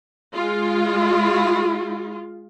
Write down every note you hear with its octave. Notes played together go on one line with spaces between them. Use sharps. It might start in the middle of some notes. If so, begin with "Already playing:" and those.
G#3 F4